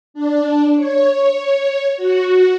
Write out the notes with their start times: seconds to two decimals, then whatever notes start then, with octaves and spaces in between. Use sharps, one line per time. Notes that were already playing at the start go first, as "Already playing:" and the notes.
0.14 D4
0.76 C#5
1.97 F#4